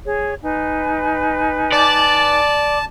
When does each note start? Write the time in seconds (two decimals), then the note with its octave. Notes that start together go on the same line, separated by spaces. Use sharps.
0.06 G#4 C#5
0.44 D#4 B4 G#5
1.73 D5 A5